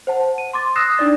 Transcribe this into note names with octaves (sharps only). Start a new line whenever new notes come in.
C5 F#5 A5
D#7
C6 D6 A6
D#6 E6 F#6 A#6 C7 E7
D4 D#4 D5 A6